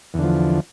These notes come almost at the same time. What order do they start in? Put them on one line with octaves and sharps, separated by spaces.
E2 D3 F3